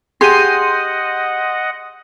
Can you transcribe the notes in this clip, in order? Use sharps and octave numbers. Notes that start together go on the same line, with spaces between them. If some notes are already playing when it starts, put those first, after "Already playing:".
G4 G#4 D#5 F#5 C6 G6 D#7